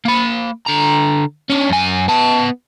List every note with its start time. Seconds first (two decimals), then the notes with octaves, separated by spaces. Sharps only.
0.05 A#3 B5
0.67 D3 A#5
1.50 C#4 D4
1.70 F#2 G#5
2.08 B3 A5